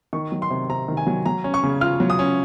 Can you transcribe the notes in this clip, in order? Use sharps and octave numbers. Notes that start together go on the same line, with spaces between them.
D#3 C#6
F#3
C6
C3
C3 A#5
D#3
G#5
F#3
F#3 A#5
C#4
C#6
C#3
F4 F6
F#3
D#6
C#4